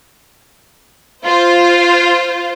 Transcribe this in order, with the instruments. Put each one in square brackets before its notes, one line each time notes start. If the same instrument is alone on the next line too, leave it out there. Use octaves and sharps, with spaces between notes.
[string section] F4 C5